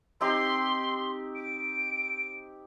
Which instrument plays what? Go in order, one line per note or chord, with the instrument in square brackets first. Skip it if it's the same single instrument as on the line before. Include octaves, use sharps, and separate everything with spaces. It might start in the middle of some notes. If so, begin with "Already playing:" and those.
[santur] C4 D#4 G4 [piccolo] C6
[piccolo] D7